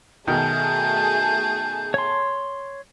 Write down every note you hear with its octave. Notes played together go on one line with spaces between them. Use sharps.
B2 D#3 A3 G#4 A5 G6
C#5 C6